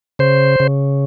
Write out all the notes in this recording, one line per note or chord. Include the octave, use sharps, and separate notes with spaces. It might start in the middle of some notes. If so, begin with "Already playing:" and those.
C#3 C5
C#3